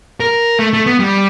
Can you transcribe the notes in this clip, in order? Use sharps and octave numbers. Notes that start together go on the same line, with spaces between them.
A#4
A3
A3
B3
G3